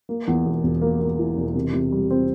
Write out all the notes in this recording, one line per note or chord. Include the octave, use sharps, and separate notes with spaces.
A#3
E2
E1
E1
A#3
A#3
E3
E1
C3
C3
G3
C4